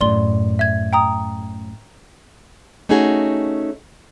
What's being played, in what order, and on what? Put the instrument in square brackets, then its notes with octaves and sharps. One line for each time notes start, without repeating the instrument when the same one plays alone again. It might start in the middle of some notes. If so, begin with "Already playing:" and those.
[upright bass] F#2 A2 [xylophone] D5 C6 G7
[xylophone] E5 G#6
G5 A#5 D#6
[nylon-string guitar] A3 C#4 D#4 F#4 G#4